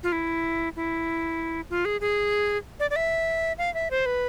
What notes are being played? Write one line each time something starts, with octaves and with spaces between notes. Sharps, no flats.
F4
E4
E4
F4
G#4
G#4
D5
D5
E5
F5
E5
C5
B4